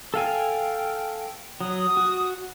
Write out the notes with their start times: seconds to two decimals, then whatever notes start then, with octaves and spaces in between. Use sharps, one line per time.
0.14 A4 F5 G5 G#5
1.61 F#3 D#6
1.97 F#4